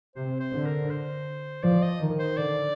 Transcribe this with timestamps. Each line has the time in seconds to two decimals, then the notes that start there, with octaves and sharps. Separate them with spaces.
0.16 C3 C5
0.40 C5
0.53 D3
0.65 A#4
0.90 C5
1.63 F3 D5
1.82 D#5
2.00 D#3
2.19 C5
2.37 D3 D5